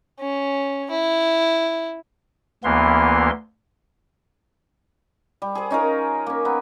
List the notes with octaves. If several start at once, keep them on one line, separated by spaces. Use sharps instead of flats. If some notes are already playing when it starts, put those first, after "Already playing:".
C#4
E4
D2 E3 A#3 B3 C6
G3
G#4 C5
C#4 D#4 F4 A#4
A#3 C#4
B3 A#5